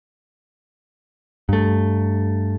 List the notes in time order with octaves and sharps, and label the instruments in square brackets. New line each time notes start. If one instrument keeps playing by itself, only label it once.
[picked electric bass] G2 A3